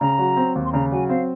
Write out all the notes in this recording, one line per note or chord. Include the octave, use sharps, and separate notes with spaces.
C#3 A#5
F#3
C4
D#2
C6
C#3 A#5
F#3 G#5
C4 F5